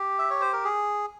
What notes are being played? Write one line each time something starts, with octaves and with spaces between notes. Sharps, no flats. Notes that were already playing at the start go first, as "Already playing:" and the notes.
Already playing: G4
E5
C#5
C5
A#4
G#4